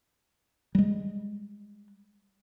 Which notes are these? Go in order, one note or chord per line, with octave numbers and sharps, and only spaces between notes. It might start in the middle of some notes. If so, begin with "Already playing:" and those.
G3 G#3